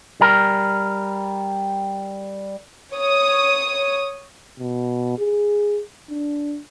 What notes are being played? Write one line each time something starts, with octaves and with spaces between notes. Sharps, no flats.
G3 A#4
C#5 D#6
B2
G#4
D4